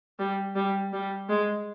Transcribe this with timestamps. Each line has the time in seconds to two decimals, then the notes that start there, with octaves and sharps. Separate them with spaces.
0.19 G3
0.55 G3
0.93 G3
1.29 G#3